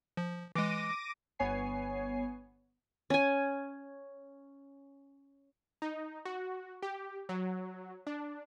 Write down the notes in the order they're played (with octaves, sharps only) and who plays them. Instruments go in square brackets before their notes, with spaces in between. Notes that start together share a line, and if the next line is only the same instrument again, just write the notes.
[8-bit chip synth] F3
[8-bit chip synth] E3 G#3 [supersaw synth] D6 A#6 D#7
[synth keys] G1 B3 C#5 G#5 C7
[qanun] C#4 G#5
[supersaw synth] D#4
F#4
G4
F#3
D4